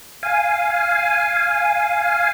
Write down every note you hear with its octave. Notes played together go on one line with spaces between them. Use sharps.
F5 G#5